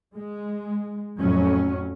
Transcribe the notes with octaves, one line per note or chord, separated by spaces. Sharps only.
G#3
F2 A2 F#3 C#4